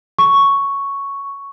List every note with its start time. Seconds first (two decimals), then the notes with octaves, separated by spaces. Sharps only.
0.19 C#6